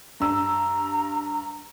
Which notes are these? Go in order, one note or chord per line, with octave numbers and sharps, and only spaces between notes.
G2 A#5 E6